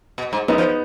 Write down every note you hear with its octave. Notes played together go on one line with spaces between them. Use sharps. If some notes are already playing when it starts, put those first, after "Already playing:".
B2
G#2
F#2 B3 D#4
F3